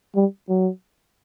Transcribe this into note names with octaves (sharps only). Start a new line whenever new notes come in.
G3
F#3